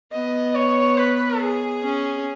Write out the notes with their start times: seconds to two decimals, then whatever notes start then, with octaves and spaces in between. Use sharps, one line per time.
0.12 B3 D#5
0.55 C#5
0.98 B4
1.40 G#4
1.82 C#4